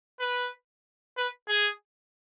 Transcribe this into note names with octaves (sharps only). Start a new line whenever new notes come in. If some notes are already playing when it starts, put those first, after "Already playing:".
B4
B4
G#4